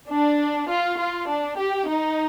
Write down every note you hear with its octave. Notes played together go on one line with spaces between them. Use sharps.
D4
F4
F4
D4
G4
D#4